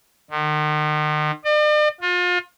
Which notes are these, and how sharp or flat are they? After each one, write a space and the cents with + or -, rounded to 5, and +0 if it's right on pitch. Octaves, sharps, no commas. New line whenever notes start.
D#3 -40
D5 +45
F4 +35